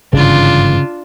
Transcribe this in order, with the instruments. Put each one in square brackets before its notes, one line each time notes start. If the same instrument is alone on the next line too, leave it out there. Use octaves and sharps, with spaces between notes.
[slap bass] G1 G#2 E3 [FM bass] C#3 [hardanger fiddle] D4 F4